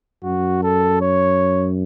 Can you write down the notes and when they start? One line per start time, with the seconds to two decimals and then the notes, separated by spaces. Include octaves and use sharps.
0.24 F#2 F#4
0.63 A4
1.01 C#5